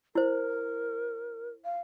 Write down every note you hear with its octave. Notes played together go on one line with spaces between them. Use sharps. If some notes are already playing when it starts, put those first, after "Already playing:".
E4 A#4 C5
F5